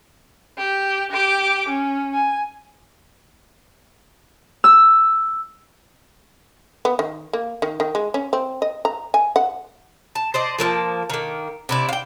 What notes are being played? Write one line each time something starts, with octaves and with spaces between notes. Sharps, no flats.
G4
G4 D6
C#4
G#5
E6
B3
D#3
A#3
D#3
D#3
G#3
C#4
C4
D#5
A#5
G#5
F#5
A5
C5 D5 D#5
F3 A#3 E5 A5
D#3 A#3
C3 E4 D5
F5 G5